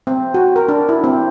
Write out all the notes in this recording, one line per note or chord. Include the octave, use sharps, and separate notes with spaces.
C4
F#4
A#4
D4
E4
C4